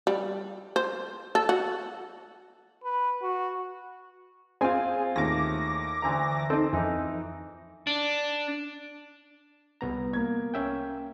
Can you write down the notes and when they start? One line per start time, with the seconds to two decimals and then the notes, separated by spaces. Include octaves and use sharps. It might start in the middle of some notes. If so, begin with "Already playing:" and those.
0.07 G3
0.76 C5
1.35 A4
1.49 F#4
2.84 B4
3.22 F#4
4.61 C4 F4 G#4 C5 G#5
5.16 D#2 A2 D6 A#6
6.02 D2 E3 A#5
6.50 C4 D#4 A4
6.73 F2 E3 D#4
7.87 D4
9.81 C2 B3 A#5
10.13 A#3 G#6
10.54 C#4 E5 G5